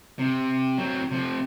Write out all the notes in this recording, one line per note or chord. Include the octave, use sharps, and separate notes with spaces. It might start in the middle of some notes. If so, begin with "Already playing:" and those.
C3
F#3 C4
C3 F3